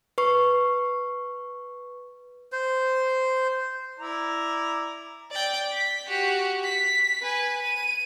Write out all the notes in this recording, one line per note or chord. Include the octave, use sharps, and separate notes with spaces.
B4 C#6
C5
E4 D5 A#5
D5 G5
B6
F#4 G4
B6
B4 G#5
D#7